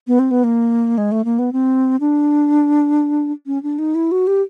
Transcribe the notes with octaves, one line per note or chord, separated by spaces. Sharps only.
B3
C4
B3
A#3
G#3
A3
A#3
B3
C4
D4
C#4
D4
D#4
E4
F#4
G4